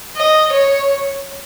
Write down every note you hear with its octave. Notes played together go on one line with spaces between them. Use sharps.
D#5
C#5